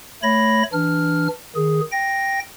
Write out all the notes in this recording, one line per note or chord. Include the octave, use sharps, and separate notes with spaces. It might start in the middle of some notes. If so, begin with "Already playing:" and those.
A3 C#5 B5 A#6
E3 D4 F6
D#3 G#4
G5 A#6